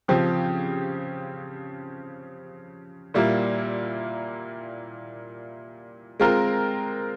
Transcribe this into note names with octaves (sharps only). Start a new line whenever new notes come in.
C#3 F3 C4 G4
A#2 G3 A#3 E4
G#3 C4 F4 A#4